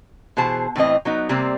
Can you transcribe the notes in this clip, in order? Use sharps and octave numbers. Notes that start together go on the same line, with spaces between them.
B2 E3 G#4 C5 A5
A2 E3 C4 D#5
F#3 B3 D#4
C3 G3 A#3 C4 C5